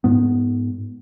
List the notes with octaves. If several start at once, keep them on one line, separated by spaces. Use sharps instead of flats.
G#2 B3